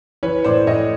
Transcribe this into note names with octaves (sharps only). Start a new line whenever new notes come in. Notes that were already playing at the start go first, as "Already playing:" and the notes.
E3 B4 C#5
A2 C5 D5
A2 C#5 D#5